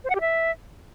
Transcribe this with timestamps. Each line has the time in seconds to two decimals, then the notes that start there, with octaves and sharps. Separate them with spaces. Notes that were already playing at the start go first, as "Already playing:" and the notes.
0.04 C5
0.10 F#5
0.15 G4
0.21 E5